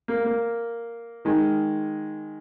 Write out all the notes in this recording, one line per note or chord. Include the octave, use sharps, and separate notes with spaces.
A#3
A#3
D#3 G#3